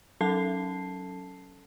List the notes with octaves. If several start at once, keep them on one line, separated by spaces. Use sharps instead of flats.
F#3 C#4 A4 A5 C7